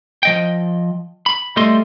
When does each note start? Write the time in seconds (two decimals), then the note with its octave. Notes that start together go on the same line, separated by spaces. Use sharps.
0.23 F3 D#5 G5
1.26 B5
1.56 G3 A3 A4 D#5 C6